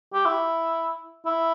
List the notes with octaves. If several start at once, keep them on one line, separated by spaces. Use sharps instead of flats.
G4
E4
E4